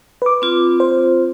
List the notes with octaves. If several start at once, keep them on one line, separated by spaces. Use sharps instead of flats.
B4 D6
C4 F4
C5